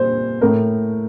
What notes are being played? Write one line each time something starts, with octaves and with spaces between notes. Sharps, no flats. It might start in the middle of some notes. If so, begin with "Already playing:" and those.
Already playing: A#2 G3 A#3 C5
A2 A3 A#4